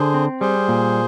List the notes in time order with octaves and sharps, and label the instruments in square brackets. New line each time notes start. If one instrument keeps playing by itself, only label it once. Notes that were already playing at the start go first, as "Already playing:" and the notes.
Already playing: [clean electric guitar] D3 [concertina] G#4 C5
[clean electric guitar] C4
[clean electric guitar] G3 [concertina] G#4 C5
[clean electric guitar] A#2